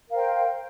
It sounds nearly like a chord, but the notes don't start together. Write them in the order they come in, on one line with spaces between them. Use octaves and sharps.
A#4 F5 C5 G5